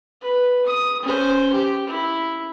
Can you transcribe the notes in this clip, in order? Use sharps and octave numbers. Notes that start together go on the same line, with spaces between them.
B4
D#6
C#4 C5
G4
E4